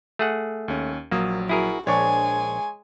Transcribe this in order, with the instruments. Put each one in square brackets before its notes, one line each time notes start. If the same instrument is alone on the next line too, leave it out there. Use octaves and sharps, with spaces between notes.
[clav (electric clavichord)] A3 G#4 F#5
[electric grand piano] D#2 C#4
[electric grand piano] A#1 F#3 D#6 [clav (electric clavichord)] A#3
[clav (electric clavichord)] E4 G#4 A#4 [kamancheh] F#4
[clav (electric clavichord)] A#1 D4 [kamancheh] G#3 G#5 [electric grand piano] C#5 C#6